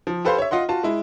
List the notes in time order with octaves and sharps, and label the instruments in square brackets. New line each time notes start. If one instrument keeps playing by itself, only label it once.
[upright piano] F3
G4 A4 B4 C5 F5 C6
C#5 E5
F4 D#5 F#5 C6
F4 F#4 A5
G#3 E4